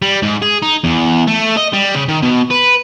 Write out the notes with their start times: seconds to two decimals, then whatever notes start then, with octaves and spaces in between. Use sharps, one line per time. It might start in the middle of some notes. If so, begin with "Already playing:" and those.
0.02 G3
0.23 G#2
0.42 G#4
0.62 D#4
0.84 E2
1.27 A3
1.57 D#5
1.73 G3
1.94 C#3
2.08 D#3
2.22 B2
2.50 B4